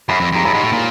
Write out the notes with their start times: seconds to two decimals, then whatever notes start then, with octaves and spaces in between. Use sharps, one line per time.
0.09 F#2 B5
0.20 F2
0.32 F2 A#5
0.45 F#2 B5
0.54 G#2
0.63 A2
0.72 A#2 A#5